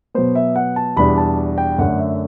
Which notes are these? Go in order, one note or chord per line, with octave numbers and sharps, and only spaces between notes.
B2 F#3 B3 C5
E5
F#5
A5
E2 B2 G3 D4 B5
A5
G5
F#2 D3 A3 F#5
E5